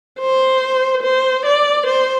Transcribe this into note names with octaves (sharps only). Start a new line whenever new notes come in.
C5
C5
D5
C5